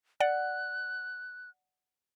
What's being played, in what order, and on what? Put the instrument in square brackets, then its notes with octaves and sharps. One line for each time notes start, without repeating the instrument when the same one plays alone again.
[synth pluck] D5 F#5 [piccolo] F#6